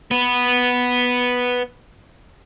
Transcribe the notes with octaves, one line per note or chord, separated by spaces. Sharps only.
B3 B4